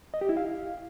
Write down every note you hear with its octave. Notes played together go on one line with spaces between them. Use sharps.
D#5
G4
E4
F5